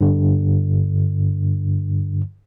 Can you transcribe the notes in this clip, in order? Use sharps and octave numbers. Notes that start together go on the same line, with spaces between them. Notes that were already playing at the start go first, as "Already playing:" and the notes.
G2 D3